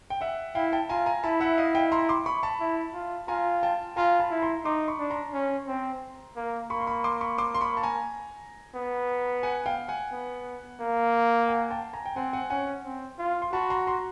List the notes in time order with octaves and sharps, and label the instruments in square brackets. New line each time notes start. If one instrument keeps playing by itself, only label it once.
[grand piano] G5
E5 F#5
[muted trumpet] E4 [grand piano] F5 G5
[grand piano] G5 A5
[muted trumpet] F4 [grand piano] G#5 A#5
[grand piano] G#5 A#5
[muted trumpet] E4 [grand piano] A5 B5
[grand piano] E5 F#5
D#5 F5
F5 G5
A#5 C6
C6 D6
B5 C#6
A5 B5
[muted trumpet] E4
F4
[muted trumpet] F4 [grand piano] G#5 A#5
[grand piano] G5 A5
[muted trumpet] F4 [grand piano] G#5 A#5
[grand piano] A5 B5
[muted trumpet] E4
[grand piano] A#5 C6
[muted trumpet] D#4 [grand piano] C6 D6
[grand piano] B5 C#6
[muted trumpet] D4
[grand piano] A#5 C6
[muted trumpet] C#4
C4
A#3
[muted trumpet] A#3 [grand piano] B5 C#6
[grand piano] C6
B5 C#6
C6 D6
B5 C#6
C6 D6
C6
B5 C#6
A5
G#5 A#5
[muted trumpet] B3
[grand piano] F#5 G#5
F5 G5
F#5 G#5
[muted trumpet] B3
A#3
[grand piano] F#5 G#5
G5 A5
G#5 A#5
G5
[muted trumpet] C4 [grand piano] F#5 G#5
[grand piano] F#5 G#5
[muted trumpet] C#4 [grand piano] F#5 G#5
[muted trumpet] C4
F4
[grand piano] C6
[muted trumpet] F#4 [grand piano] A5 B5
[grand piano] A#5 C6
A#5 C6